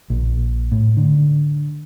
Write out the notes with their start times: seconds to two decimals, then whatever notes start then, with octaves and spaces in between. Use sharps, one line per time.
0.10 A#1
0.72 A2
0.97 D3